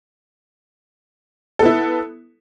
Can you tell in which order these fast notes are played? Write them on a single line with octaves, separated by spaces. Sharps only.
A4 B3 E4